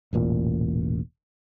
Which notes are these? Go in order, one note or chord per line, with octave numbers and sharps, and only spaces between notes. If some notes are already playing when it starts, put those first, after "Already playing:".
E1 A1 A#2